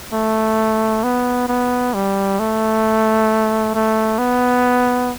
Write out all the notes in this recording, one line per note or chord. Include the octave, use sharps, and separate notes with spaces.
A3
B3
B3
G3
A3
A3
B3